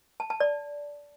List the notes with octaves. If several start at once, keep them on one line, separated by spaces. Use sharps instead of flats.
A5
A5
D5